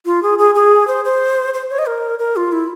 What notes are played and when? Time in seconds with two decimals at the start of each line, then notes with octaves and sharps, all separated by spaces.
0.06 F4
0.23 G#4
0.39 G#4
0.55 G#4
0.87 C5
1.05 C5
1.54 C5
1.70 C#5
1.79 D#5
1.86 A#4
2.19 A#4
2.36 F4
2.52 E4